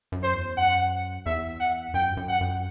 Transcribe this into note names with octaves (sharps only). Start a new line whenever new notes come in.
F#2
C5
E2
F#2 F#5
E2 E5
F#5
F#2 G5
G2
F#2
F#5
F#2